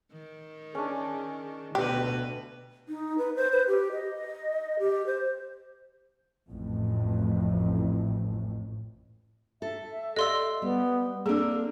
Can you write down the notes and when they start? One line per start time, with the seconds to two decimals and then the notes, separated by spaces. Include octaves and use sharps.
0.12 D#3
0.75 C#4 D4 G#4
1.75 D2 B2 G4 B4
2.89 D#4
3.18 B4
3.36 C5
3.53 B4
3.68 G4
3.92 D#5
4.79 G4
5.07 C5
6.49 A1 F2 A2
9.62 A4 E5
10.16 G4 A4 D5 D#5 F5 C6 E6
10.62 G3 B3
11.26 A#3 C4 D4 G#4 A4